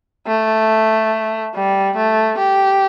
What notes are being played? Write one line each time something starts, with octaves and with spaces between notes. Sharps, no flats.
A3
G3
A3
G4